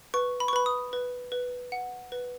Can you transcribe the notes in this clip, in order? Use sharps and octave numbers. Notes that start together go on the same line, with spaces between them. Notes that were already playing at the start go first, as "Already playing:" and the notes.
B4 C#6
B5
C#6
B4 B5
D#6
B4
B4
F#5
B4